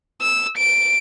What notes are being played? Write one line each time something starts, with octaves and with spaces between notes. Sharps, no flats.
E6
D7